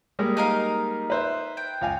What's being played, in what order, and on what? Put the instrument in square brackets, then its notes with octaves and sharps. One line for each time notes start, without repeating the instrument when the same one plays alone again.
[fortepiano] G3 G#3 A#3
[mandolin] D#4 A#4 F5
[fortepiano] B4 C5 E5
[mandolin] G5
[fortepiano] C#2 F5 G#5